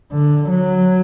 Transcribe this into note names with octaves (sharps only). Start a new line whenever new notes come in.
D3
F#3